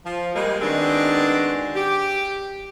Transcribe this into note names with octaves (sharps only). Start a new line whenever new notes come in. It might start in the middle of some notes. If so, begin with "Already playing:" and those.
F3
G3 G#3 A#3
D#3 G#3 B3 C4 D4 F#4
G4